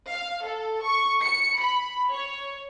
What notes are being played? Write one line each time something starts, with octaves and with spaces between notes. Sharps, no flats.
F5
A4
C#6
C#7
B5
C#5